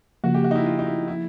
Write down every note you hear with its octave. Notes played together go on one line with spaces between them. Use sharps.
C#3 F3 A#3 F#4
G4
F#4
D#4
E4
F4
D#4
E4
E4